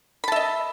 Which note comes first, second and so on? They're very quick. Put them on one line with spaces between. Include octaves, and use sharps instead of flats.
B5 A5 E5 D#5